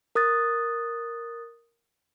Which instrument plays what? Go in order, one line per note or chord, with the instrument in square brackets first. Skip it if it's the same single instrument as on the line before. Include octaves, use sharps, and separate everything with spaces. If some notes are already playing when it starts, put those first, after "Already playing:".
[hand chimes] A#4 D#6 F#6 A6